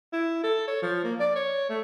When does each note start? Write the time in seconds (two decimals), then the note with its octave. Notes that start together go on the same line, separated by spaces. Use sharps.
0.13 E4
0.43 A4
0.67 C#5
0.82 F3
1.04 A#3
1.20 D5
1.35 C#5
1.69 A3